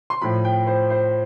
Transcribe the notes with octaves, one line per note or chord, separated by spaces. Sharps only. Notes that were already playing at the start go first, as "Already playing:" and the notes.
C6
A2 F3 B5
G5
C5
C5